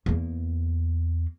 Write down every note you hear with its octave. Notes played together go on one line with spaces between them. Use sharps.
E2 A#3